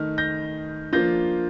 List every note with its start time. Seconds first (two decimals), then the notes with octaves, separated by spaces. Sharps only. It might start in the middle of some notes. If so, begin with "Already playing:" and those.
Already playing: D#3 A3 D#4 F6
0.18 G6 A#6
0.93 F3 A#3 D4 F4 G6 A#6